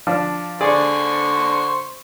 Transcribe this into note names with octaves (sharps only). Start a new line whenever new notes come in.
F3 D4
D3 G#4 C5 D5 C#6